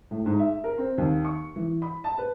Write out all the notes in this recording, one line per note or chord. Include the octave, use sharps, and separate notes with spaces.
A2
G#2
E5
A#4
C4
D#2
C#6
E3
B5
A5
B4